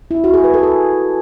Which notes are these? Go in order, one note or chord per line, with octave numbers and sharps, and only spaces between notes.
E4
F#4
G#4
B4
A4
G#4